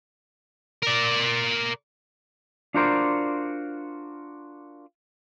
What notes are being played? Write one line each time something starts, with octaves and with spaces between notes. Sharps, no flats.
A#4 D5
D4 F4 F#4 A#4 C5 D5